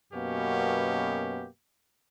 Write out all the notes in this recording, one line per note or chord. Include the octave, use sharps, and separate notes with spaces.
F#2 B2 A#3 B3 C#4 G4